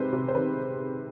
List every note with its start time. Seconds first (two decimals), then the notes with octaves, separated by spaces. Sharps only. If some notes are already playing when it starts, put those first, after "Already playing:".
Already playing: C3 D#3 G#3 G#4 B4 C5
0.13 C3
0.28 C5
0.35 D#3 B4